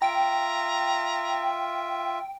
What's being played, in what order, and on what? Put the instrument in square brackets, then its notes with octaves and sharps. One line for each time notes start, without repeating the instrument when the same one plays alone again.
[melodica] F4 E5 [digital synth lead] G5 [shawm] A#5